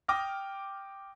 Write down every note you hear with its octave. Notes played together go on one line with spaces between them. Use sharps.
G5 D6 D#6 F6 A#6